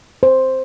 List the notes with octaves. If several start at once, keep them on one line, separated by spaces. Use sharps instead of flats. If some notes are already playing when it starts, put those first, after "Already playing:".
C5